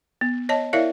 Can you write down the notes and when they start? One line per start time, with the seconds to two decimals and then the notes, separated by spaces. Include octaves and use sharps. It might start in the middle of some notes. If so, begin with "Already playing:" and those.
0.21 B3
0.49 C#5 D#5 A5
0.73 E4 A#4 C#5 D5 E5 F5